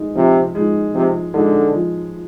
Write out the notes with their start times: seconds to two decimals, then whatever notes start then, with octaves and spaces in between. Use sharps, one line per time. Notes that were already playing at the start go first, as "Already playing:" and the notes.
Already playing: G#3 D#4
0.15 C3 F3
0.55 G#3 D#4
0.94 C3 F3
1.34 D3 G#3 D#4
1.74 F3